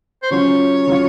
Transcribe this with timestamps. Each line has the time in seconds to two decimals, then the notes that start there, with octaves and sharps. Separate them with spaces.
0.23 C5
0.30 C#3 F#3 C#4 F4 C#5
0.87 C#3 F#3 C#4 F4